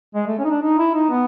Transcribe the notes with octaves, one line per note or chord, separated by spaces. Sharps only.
G#3
A3
C#4
D#4
D4
D#4
E4
D#4
B3